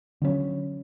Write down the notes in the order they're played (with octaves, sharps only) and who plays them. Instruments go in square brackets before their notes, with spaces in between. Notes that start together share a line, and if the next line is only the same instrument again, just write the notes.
[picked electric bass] D3 F#3 C#4